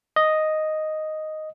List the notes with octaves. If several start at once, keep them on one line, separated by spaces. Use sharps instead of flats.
D#5